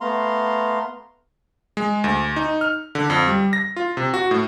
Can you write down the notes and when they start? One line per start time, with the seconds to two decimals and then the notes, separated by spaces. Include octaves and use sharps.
0.01 A3 B3 F5 A#5 C6
1.77 G#3
2.04 D2
2.36 D#4
2.61 F6
2.95 D3
3.10 F2
3.28 G3
3.53 A#6
3.76 F4
3.97 C3
4.14 F#4
4.31 A2